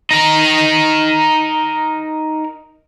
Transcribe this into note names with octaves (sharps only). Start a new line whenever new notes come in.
D#4 A#4